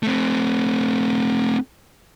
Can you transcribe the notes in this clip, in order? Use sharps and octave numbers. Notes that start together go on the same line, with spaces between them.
A3 C4